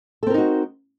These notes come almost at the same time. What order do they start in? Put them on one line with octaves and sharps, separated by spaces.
A4 C4 A#4 D#4 F#4